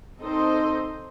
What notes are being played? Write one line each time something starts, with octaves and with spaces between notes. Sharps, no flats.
C4 D#4 A4 C5 D#5